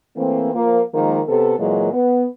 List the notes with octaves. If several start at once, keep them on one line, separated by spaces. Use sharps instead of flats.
E3 A3 A#3 C4
F3 A#3
D#3 F3 G#3 A#3
C3 B3 A4
A#2 E3 F#3 G#3 A#3
B3